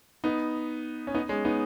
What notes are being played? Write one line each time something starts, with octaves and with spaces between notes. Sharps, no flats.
B3 D#4
C#4
B3 D#4
G#3 C#4
B3 D#4